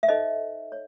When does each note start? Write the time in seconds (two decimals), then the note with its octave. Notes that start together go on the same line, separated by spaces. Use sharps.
0.03 E5
0.09 D#4 A4 C5 D#5
0.72 C#5